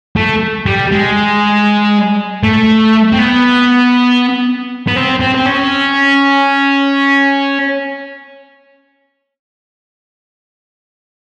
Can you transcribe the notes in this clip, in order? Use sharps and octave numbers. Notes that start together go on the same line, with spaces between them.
A3
G3
G#3
A3
C4
B3
B3
C4
C4
C4
C#4